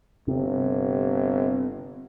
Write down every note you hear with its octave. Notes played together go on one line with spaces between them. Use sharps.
G1 C3